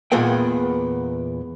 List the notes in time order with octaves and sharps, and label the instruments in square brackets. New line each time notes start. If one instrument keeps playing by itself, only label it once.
[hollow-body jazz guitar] E2 A#2 G#3 B3 G5